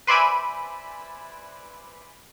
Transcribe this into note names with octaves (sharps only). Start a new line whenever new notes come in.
B4 C5 D5 E5 G#5 B5